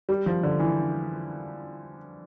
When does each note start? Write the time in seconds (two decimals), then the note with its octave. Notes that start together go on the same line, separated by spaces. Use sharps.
0.09 G3
0.26 F3
0.43 D3
0.59 E3